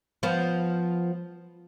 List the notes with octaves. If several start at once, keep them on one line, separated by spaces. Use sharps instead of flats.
F3 B3